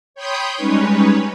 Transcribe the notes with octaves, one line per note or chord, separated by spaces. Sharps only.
C#5 G5 B5 C6 D#6 G6
G3 G#3 C#4 D#4 B4 C#5